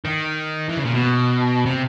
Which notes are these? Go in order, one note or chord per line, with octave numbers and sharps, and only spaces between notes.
D#3
E3
C#3
A#2
B2
C3